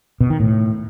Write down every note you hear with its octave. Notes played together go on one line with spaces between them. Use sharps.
B2
D#3
A2